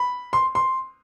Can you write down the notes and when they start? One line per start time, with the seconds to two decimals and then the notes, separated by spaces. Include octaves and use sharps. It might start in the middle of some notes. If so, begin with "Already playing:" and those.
Already playing: B5
0.33 C6
0.55 C6